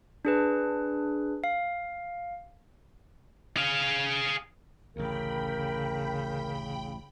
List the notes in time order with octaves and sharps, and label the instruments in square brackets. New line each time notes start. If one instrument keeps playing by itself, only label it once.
[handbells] D4 G#4 B4
F5
[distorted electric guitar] G#4 F5
[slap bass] A1 D2 [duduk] C#3 [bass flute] A#4 [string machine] G5 B5